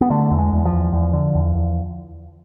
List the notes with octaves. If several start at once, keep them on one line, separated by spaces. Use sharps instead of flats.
B3
D3 A3
E2
G#3
E2
F3
E2
E2
D3
E2
E2